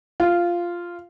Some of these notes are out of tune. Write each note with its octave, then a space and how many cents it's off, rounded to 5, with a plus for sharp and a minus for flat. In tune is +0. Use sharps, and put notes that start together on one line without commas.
F4 -5